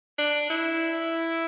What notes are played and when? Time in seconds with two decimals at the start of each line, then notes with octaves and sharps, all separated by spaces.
0.18 D4
0.50 E4